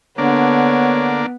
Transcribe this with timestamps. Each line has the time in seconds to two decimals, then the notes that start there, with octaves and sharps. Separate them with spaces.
0.18 D3 A#3 B3 D4 C#5